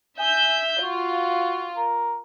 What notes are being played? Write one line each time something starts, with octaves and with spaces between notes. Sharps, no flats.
E5 G#5 G6
F4 F#4
A#4